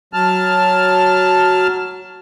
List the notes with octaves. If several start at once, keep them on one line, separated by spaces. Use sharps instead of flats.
F#3 A5 F6